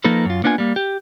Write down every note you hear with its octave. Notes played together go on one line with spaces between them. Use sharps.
F3 A#3 D#4 A4 B4
F#2 F4
A#3 B3 D4 F4 G#5
G3 A#3
G4